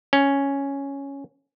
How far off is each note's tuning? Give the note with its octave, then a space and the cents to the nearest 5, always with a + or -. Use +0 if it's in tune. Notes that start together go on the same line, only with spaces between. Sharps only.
C#4 +0